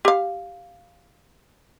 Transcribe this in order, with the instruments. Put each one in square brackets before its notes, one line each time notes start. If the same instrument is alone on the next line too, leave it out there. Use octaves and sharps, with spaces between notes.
[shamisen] G4 F5